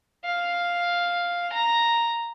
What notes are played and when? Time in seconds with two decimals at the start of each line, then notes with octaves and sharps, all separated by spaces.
0.25 F5
1.53 A#5